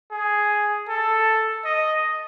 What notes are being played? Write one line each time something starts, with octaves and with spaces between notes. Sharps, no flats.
G#4
A4
D#5